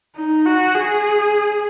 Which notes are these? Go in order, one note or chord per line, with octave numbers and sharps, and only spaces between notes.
D#4
F#4
G#4